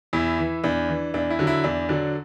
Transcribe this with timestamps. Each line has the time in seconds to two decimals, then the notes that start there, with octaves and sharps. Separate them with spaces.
0.13 E2 E4
0.38 E3
0.64 E2 D4
0.89 E3
1.14 E2 D4
1.30 E4
1.39 D3 F#3
1.47 E4
1.64 E2 D4
1.89 D3 F#3 D4